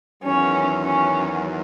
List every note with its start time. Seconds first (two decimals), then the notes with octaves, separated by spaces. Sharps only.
0.23 E2 D#3 F#3 C#4
0.82 C#4